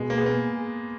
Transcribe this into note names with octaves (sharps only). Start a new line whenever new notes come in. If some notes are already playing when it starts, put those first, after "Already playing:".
Already playing: B2 G#3
A#3
B3 G#4
A#3